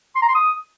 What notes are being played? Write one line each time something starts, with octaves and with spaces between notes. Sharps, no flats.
C6
A#5
C6
D#6